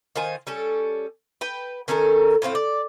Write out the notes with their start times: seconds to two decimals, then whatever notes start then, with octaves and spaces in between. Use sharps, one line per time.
0.16 D#3 F4 C5 G#5
0.47 G3 C#4 A4
1.41 B4 G5
1.88 D#3 C#4 A4 A#4
2.42 A2 F3 C4 F5
2.55 D5